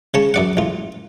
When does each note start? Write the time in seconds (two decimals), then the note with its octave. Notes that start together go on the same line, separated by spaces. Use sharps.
0.14 C#3 C#4 A5
0.34 F#2 D5 F#5
0.57 A1 F4